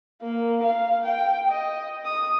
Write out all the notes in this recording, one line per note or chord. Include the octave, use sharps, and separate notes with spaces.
A#3
F5
G5
D#5
D#6